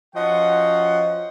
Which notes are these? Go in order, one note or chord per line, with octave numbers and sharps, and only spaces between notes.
F3 C#4 F#4 D#5 F#5